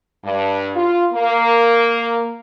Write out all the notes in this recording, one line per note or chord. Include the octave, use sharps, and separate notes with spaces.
G2
F4
A#3